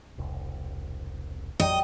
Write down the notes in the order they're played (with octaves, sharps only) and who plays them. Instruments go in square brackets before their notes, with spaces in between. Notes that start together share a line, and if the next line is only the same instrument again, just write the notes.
[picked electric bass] E1 C2
[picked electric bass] A1 F2 F#3 [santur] D5 G5 [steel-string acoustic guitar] D#5